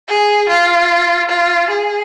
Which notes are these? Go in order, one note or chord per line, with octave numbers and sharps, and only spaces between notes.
G#4
F4
F4
G#4